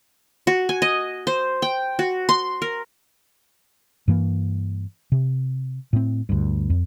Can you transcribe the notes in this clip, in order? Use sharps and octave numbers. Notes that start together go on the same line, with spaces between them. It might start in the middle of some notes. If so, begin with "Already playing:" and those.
F#4
G#5
D#5
C5
G5
F#4
C6
A#4
G2 E3 A#3
C3
A2 C4
D2 G2
F2